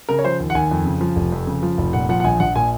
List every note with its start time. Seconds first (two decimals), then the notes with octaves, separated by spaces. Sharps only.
0.09 C#3 A#4
0.19 C#5
0.25 F3 C5
0.40 D#2
0.50 F#5
0.55 D#2 G#5
0.71 F2
0.85 C#3
1.01 F3
1.16 F1
1.32 F2
1.47 C#3
1.63 F3
1.78 F1
1.93 A#2 F#5
2.09 F3 F#5
2.20 F#5
2.24 A#1 G#5
2.40 A#1 F#5
2.56 A#2 G#5